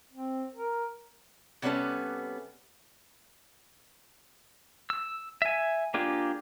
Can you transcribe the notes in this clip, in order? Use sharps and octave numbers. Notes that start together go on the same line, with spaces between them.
C4
A#4
C3 G3 B3 C#4 A4
E6
E5 G#5
A#3 D4 F4 G4 G#4